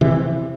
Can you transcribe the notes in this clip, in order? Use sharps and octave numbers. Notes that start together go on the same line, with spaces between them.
C3 E3